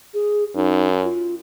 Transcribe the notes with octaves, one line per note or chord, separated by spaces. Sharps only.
G#4
F#2 D#4
F4